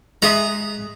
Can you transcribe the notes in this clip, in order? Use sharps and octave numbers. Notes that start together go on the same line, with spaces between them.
G#3 G#4 E5 A#5 D#6